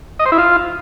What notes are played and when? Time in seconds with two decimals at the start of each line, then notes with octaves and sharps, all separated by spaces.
0.19 D#5
0.26 C5
0.32 E4
0.38 F4